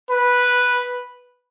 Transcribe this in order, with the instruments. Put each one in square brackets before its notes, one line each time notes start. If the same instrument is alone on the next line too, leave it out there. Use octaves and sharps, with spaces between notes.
[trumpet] B4